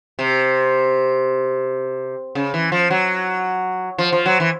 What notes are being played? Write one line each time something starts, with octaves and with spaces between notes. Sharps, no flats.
C3
C#3
E3
F3
F#3
F3
F3
F#3
E3